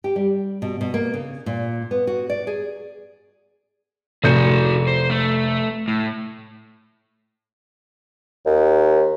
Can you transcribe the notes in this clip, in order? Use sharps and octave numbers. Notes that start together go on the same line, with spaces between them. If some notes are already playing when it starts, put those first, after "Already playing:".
G4
G3
B2
B2
A#3
C#3
A#2
B3
F#4
D5
G#4
F1 F#4 G#4 G6 C#7
C5
A3
A2
D#2